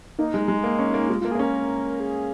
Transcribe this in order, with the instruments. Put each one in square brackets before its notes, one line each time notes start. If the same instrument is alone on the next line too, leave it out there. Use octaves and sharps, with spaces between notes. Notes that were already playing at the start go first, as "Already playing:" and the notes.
[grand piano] A#3 [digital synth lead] D#4
[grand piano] G#3
G#3
A#3
C#4
A#3
[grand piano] G#3 [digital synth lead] F4
[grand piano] A#3 [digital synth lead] F4
[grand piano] A#3 [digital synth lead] G#4
[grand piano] C#4 [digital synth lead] A#4
[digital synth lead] G#4